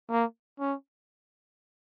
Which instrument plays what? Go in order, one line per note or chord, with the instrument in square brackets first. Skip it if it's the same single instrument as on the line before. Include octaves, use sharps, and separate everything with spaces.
[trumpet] A#3
C#4